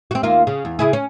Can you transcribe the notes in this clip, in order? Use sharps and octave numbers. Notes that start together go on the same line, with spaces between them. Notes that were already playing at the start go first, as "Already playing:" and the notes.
C4 F#4
D#2 A#3 F4
C#3
E2
C#3 E4 G#4
C#4